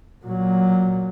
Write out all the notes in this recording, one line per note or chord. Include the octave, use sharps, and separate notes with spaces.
A#2 F#3